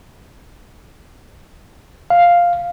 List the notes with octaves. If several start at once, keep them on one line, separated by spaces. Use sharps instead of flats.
F5